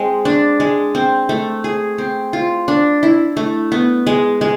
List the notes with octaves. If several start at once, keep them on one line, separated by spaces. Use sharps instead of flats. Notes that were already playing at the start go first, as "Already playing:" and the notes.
Already playing: G#3 C4
D4
G#3
C4
A3
G#4
C4
F4
D4
E4
A3
B3
G#3
G#3